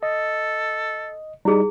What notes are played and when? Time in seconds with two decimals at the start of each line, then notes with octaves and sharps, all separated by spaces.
0.03 A4 D#5
1.45 G3 D#4 E4 G#4